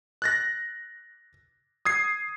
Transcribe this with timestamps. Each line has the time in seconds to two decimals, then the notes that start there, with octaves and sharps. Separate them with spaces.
0.22 F#6 A6 A#6
1.85 D#6 G#6 C7